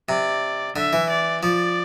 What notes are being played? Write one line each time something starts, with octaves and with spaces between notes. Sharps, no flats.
C3 D5
D3 E5
E3
D5
F3 D5